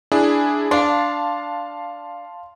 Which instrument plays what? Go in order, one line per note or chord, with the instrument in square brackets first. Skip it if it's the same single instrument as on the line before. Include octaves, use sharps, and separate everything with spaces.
[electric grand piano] D4 E4 G#4
[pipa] D4 [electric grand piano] F5 A5 C6